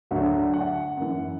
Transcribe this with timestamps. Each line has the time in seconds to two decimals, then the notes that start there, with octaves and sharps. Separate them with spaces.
0.11 D2 D3 F#3 F#4
0.54 F#5
0.97 F#2 E3